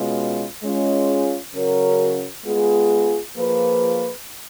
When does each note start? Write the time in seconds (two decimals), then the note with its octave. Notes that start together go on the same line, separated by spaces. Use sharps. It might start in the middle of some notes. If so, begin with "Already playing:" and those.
Already playing: B2 G#3 C#4 F4
0.63 G#3 C#4 F4
1.54 C#3 F#3 C#4 F#4 A#4
2.45 G#3 B3 F4 G#4
3.36 F3 A#3 F4 G#4 B4